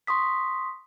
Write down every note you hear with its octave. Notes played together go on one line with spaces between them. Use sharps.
C6 C#6 D#6 B6